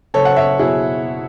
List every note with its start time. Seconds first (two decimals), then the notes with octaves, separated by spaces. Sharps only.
0.14 F#1 A4 C#5
0.25 F#5
0.36 C#5 E5
0.59 B2 F#3 E4 G#4